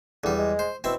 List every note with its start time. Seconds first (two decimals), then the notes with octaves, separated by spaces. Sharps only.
0.24 E2 D3 G3
0.38 G#3
0.59 C5
0.84 B2 C4 E4